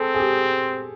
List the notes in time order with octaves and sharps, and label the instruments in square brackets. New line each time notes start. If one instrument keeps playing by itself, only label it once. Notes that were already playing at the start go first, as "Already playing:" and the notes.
Already playing: [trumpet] C4 [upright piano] G#4 A4
[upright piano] G#4
G4